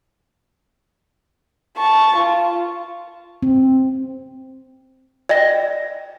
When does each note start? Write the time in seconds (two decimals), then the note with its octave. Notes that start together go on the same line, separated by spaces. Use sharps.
1.78 A5 C#6
2.16 F4
3.43 C4
5.29 D5 D#5 G5 A#6